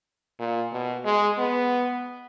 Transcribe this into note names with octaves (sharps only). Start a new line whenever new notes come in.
A#2
B2
G#3
B3